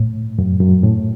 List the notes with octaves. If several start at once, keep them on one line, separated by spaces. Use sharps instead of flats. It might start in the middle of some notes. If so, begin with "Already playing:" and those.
Already playing: A2
F#2
F#2
A2